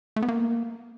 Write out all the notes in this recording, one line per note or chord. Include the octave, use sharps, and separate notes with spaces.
A3
B3
A#3